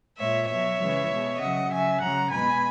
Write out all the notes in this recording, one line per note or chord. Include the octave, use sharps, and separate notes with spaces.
A#2 G#3 C#5 E5
B2 F#3 C#5 E5
C#3 E3 G#3
B2 G#3
C#3 F#3 D#5 F#5
C#3 F#3 E5 G#5
C#3 F#3 F#5 A#5
B2 G#3 G#5 B5